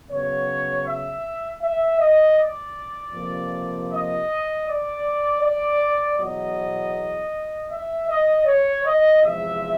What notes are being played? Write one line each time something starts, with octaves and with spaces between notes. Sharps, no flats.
C#3 F#3 B3 C#5
E5
E5
D#5
D5
F2 C3 F3 A#3
D#5
D5
D5
E2 B2 F#3 D#5
E5
D#5
C#5
D#5
E2 C3 F3 G#3 E5